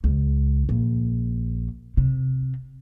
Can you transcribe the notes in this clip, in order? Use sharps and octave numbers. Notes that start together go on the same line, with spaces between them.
C#2
A#1
C3